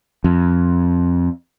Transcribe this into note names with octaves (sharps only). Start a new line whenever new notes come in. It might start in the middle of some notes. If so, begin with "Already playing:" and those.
F2